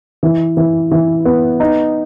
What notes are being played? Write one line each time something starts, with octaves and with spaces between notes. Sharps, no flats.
E3
E3
E3
B3
D#4